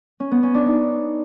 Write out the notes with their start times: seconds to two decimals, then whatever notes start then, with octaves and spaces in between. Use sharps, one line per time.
0.20 C#4
0.31 B3
0.43 C#4
0.54 D4
0.66 D#4